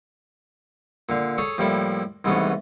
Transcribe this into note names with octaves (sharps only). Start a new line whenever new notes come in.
A#2 D3 F5
G#4 A4 C#5
A2 F3 G3 A#3 E4 A4
C2 G#2 E3 A3 B3 C#4